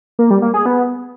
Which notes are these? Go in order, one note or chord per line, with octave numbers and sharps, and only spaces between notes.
A#3
G3
A#3
G#4
B3